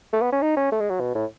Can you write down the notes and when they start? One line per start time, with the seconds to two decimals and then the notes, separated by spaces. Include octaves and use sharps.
0.13 A3
0.22 B3
0.32 C#4
0.42 D#4
0.57 C#4
0.72 A3
0.80 G#3
0.90 F#3
1.00 B2
1.15 A2